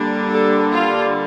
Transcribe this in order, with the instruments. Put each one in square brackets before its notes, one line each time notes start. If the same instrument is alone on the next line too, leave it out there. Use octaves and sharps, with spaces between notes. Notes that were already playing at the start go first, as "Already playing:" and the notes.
Already playing: [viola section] D3 G3 A#3 D4
A4
F4